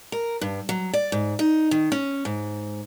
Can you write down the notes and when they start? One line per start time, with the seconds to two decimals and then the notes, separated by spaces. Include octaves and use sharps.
0.12 A#4
0.41 G2
0.69 F#3
0.93 D5
1.12 G#2
1.39 D#4
1.71 D#3
1.92 C#4
2.25 G#2